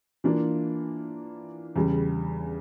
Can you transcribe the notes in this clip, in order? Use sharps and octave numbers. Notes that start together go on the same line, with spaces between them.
E3 A#3 D4 F4
E2 C#3 G3